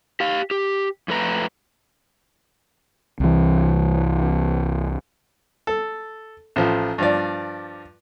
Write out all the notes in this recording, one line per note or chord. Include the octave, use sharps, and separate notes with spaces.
G4 F5
G4
F2 A3 B4 A#5
C2 E3
A4
A1 F3
G2 F3 D5